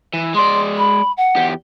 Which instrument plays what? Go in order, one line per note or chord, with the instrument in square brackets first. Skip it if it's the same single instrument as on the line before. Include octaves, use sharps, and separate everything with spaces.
[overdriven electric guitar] E3
[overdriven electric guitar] G#3 D5 [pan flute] C6
[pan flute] B5
F#5
[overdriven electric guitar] E2 G4